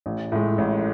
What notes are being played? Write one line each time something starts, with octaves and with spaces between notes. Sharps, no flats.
A1
A2 G#3
A1